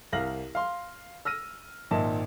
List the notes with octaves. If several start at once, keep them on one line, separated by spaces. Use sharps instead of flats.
C2 A#4 F5 A#6 F#7
F5 C6
E6 F6 A#6 D#7
G#1 A#2 D#3 D#5 E5 A5